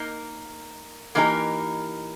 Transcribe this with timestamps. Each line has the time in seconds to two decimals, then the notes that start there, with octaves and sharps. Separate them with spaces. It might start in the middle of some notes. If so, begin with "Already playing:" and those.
Already playing: A#3 D#4 A#4
1.15 E3 A#3 D#4 G4 A#4